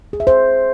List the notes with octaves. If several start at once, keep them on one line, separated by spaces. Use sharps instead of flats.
G#4
E5
C5